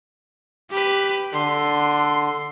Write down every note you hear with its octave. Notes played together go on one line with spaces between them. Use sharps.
G4 B4
D3 C6